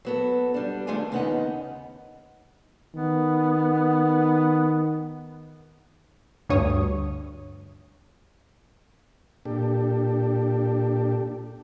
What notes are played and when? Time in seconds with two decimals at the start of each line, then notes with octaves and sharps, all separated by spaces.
0.05 F#3 B3 A4
0.54 G3 D4
0.87 D#3 A3 D4 F4 G#4 G#5
1.12 D#2 C#3 B3 C#4 D#4 F#5
2.95 D#3 B3
6.49 D2 G2 C#5 D#6
9.45 A#2 D4 G4 A4